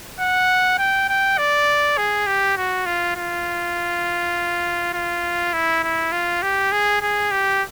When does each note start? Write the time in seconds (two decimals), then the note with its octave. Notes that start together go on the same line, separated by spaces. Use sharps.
0.20 F#5
0.78 G5
1.09 G5
1.38 D5
1.97 G#4
2.27 G4
2.57 F#4
2.86 F4
3.16 F4
4.93 F4
5.53 E4
5.83 E4
6.12 F4
6.42 G4
6.72 G#4
7.01 G#4
7.31 G4